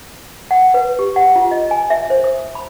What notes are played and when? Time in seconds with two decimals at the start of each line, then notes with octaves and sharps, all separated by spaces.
0.51 F#5
0.74 B4
0.99 G4
1.16 F#5
1.36 F4
1.51 D#5
1.71 G#5
1.90 E5
2.10 C5
2.24 D#6
2.55 B5